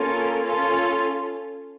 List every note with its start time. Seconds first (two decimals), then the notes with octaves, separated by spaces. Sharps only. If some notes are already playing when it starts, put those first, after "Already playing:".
Already playing: A#3 C#4 F4 A4
0.43 C#4 F4 A4